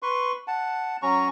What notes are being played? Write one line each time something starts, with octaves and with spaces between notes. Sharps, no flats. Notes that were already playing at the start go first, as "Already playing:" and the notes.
B4 C6 C#6
F#5 A5
F#3 C#4 A#5 C#6